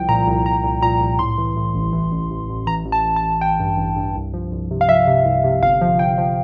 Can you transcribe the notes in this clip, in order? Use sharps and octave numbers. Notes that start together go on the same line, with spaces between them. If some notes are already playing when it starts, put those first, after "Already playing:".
Already playing: C2 F3 G5
A#2 A#5
C2
C2 A#5
C2
A#2 A#5
C2
A2 C6
E3
A2
A1
E3
A1
A1
A1
E3 A#5
A1
A5
A1
A5
A1
A1 G5
G2
A1
G2
C2
F3
C2
C3
F5
F3 E5
C3
C2
C3
G1 F5
F3
G1 G5
F3